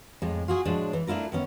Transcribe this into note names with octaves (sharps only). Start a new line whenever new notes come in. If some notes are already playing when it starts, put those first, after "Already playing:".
F2 A2 G#3
F4 F#4 G#4
A2 F3 F#3 G#3 D4
E3
A3 D4 E4 F4 A#4
D#3 B3 C#4